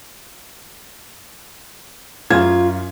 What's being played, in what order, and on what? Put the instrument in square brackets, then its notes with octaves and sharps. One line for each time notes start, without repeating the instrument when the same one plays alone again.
[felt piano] F#2 G#6 [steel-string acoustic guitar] F4